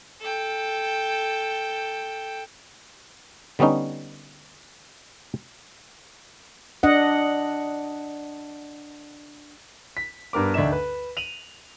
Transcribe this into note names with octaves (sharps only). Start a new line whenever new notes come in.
A4 G5
D3 G3 B3 C#4 D#4
D4 D#5 F#5
B6
G2 B3 A#4 D6
D2 D4 D#4 E5 E7
B4
D#7 F7 F#7